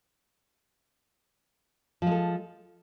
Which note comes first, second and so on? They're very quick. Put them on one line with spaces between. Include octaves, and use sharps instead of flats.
F3 G#3 A4